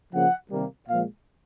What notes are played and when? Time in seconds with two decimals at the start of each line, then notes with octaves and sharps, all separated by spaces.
0.13 C#3 F3 A#3 F#5
0.51 C3 D#3 G3 A#3
0.89 A#2 F3 G#3 F5